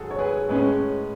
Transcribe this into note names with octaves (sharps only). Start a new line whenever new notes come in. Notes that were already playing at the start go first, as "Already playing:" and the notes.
Already playing: G#2 D#3 F#3 F#4 G#4 A4
C#5
G#4 B4
A2 G#3 C#4 G#4 B4